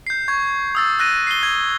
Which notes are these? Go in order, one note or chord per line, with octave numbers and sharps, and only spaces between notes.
G6 C7
C#6 G#6
D#6 E6 A6
E6 F#6 A#6 D#7
C7 G7
G#6 G7